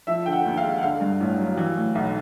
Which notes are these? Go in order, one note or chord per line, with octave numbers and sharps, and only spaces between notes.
F3 E5
D3 G5
F#5
D#2
F5
G#3
F#5
D3 F5
G2
A1
F#3
E3
A2
B1